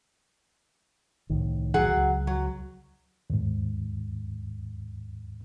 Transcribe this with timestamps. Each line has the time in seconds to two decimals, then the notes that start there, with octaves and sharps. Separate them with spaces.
1.30 C2 A2 D#3
1.74 F#3 G#4 F#5
1.87 C#2
2.27 F#3
3.30 D#2 G#2